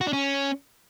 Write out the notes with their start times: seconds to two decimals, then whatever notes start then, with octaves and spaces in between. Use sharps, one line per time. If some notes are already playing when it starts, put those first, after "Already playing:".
0.01 F#4
0.07 D4
0.13 C#4